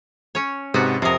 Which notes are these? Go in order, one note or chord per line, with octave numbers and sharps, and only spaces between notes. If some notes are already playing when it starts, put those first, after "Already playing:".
C#4 C#5
G#2 C3 B3 F#4
F2 C3 A#4 D#6